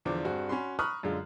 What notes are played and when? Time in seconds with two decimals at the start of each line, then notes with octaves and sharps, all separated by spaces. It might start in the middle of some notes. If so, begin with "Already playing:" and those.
0.05 E2 D3 F3 D6
0.24 G2 C4 F#4 G#4
0.49 C#4 F#4 B5 C6
0.79 A#5 B5 C#6 D#6 F6 F#6
1.03 F#2 D3 G#3 F4